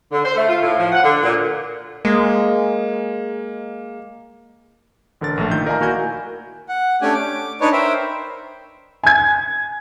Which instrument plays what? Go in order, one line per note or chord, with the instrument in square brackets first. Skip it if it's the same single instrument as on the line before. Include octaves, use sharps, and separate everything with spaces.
[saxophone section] D3
C5
A3
F4
A2
F3
F#5
D3
A#2
[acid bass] G#3 [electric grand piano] A#3
[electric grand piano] A1 D3 A#4 A6
A#1 A3
A#2 D#3 G6
A#4 D5 D#5 F5 G#5 A#5
A#3 E4 F#4 A#4 G#5 G6
[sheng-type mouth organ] F#5
A3 C#4 D4 G4 G#5
D6
D4 D#4 B4 C#5
A#4 C5 E5 G5 B5
[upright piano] G#5 G#6